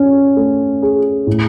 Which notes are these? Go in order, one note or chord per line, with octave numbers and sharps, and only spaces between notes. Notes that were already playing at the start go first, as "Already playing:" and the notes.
Already playing: C#4
A3
G#4
A2